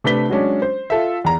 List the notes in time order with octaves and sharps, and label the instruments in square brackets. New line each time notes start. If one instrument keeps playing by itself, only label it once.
[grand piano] C3 A3 D4 B4 B6 G7
F#3 G#3 C#4 D4
C5
F4 A4 E5
E2 A#5